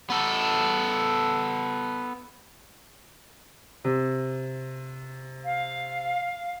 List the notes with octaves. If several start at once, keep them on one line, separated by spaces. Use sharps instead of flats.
B3 A4
C3
F5